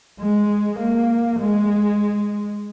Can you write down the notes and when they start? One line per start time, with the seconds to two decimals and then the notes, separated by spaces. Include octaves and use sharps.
0.20 G#3
0.79 A#3
1.39 G#3